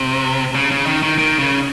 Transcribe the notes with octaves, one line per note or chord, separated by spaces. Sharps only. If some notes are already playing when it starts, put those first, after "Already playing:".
Already playing: C3
C#3
C#3
D#3
D#3
D#3
C#3